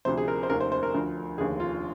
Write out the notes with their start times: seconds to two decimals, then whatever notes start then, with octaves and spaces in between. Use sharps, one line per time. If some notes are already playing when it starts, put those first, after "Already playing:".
0.05 D2 C3 F3 C5
0.17 G#4
0.28 A#4
0.43 C5
0.50 F1 D#2 D#3 A#4
0.60 C5
0.72 C5
0.83 A#4
0.94 D2 D3 F3
1.38 F1 D#2 D3 G#4
1.60 F4